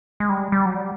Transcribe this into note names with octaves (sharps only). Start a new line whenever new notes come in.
G#3
G3
G3
F#3
G3